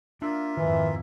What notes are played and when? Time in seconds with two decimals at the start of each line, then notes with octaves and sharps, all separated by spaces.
0.22 A#3 D4 F4 E5
0.57 F2 G#2 D#3 E3